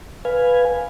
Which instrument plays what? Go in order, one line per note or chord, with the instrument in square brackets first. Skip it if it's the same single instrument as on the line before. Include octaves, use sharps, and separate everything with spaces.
[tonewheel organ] B4 F5 G#5